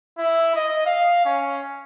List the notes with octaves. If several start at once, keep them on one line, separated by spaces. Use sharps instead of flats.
E4
D#5
F5
C#4